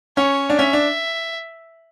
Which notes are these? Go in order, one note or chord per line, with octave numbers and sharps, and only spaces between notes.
C#4 C#5
D4
C#4 E5
D4